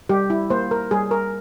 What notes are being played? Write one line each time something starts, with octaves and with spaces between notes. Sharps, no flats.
G3 G4
E4
A#3 C5
A#4
G3 G#4
A#4